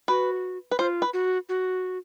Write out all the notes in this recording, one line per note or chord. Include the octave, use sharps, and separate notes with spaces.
F#4 B4
B4
F4 C5
B4
F#4
F#4